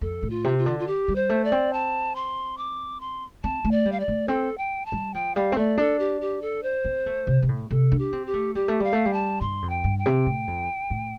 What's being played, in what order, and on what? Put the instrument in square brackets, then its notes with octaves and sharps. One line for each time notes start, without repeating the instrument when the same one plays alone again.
[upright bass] F2 [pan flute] A4
[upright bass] A2
[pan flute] F4
[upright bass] C3
[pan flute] F4
[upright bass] D3
[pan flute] F4
G4
[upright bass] G3
[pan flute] C5
[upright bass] A3
[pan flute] D5
[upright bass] C4
[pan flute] A5
C6
D6
C6
[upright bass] C4 [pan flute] A5
[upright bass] A3
[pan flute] D5
[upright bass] G3
[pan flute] F5
D5
[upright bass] A3
[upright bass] C4 [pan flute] A4
[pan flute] G5
A5
[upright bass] G3
[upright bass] F3 [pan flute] G5
[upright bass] G3 [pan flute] F5
[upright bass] C4
[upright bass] A3 [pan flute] D5
[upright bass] D4 [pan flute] A4
[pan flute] G4
G4
A4
C5
[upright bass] C4
A3
C3
C3
A2
[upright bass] C3 [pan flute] A4
[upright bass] D4
[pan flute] G4
[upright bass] C4
[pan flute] G4
[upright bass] A3
[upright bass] G3 [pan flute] G4
[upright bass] A3
[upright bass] G3 [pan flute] F5
[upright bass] A3
G3
[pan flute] A5
[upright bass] G2 [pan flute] C6
[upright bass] F2
[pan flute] G5
[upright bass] G2
[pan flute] G5
[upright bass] C3
A2
F2
A2